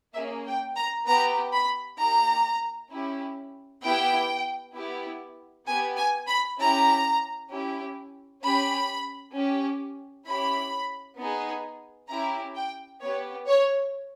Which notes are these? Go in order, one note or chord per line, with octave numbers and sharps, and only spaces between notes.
A#3 C#4 G#4 E5
G5
A#5
B3 G4 A#5
B5
A#3 D#4 G4 A#5
C#4 E4 G4
B3 E4 G4 G5
B3 E4 G4
B3 G4 G#5
G#5
B5
C#4 E4 G4 A#5
C#4 E4 G4
C#4 G4 B5
C#4 G4
C#4 E4 G4 B5
B3 D#4 G#4
C#4 E4 G4 A#5
G5
B3 G4 C#5
C#5